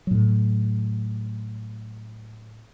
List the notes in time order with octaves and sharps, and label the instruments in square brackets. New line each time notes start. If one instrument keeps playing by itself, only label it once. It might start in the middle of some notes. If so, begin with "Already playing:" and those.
[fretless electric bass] A2 F#3